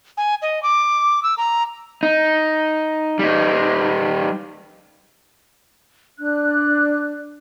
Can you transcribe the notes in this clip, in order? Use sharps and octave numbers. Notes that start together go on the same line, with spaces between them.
G#5
D#5
D6
E6
A#5
D#4
G3 D#4
D4 F#6